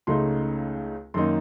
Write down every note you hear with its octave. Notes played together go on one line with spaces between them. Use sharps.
C#2 C#3 A3 D#4 C6
F#2 D#3 A#3 D#4 C6